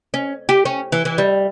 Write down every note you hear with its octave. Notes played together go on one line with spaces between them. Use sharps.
C#4
G4
C#4
E3
E3
G3